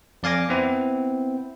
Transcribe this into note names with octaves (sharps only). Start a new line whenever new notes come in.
F2 D5 F5 G#5 D6 A#6
B3 C4 E4